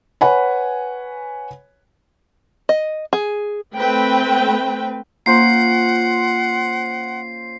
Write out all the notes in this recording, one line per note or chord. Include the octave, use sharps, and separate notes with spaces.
B4 C#5 F#5 G#5 B5
D#5
G#4
A3 C4 B4 G5
A#3 C#4 F4 C5 F#5 C7